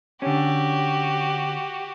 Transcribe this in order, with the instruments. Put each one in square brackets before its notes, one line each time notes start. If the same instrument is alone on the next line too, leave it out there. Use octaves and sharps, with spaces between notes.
[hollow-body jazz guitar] D3 C#4 [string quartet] F#4 G4